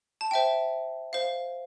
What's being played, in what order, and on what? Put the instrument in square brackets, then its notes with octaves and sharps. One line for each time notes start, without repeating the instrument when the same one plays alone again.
[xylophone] A5
C5 E5 G5
C5 F5